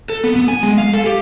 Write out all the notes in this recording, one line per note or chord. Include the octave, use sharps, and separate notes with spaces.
A4
B3
B3
G#5
G#3
F5
A4
G4